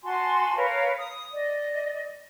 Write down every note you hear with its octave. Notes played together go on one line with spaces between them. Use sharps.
F#4 G#5 A5 C6
A#4 B4 C#5 F5
D#6
D5 D#5